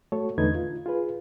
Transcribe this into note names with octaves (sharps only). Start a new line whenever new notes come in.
A3 F#4 A4 C#5
E2 D3 A3 D#4 B4 G#6
F4
F4 G#4 B4